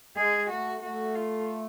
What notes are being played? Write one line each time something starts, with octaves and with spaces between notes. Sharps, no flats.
G#3 G#4
A3 F#4
A3 F#4
F4